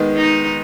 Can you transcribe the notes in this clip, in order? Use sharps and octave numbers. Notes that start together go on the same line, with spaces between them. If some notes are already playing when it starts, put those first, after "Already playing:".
Already playing: D#3 G#3 B3
D#4